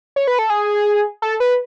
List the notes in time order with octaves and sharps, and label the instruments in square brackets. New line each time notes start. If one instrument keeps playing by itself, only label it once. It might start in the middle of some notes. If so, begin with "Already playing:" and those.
[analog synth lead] C#5
B4
A4
G#4
A4
B4